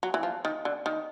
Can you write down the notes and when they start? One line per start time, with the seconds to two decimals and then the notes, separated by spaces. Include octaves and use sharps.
0.03 F#3
0.14 E3
0.23 F3
0.45 D#3
0.65 D3
0.86 D#3